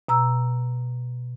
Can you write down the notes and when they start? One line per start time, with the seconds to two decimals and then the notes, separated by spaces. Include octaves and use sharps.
0.08 B2 A#5 E6